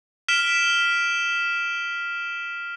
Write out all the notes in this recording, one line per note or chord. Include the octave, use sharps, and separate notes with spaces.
F6 B6 D7 E7 G7